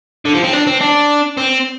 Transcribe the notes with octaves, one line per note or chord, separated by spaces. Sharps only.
D3
F3
C4
D4
C4
D4
C4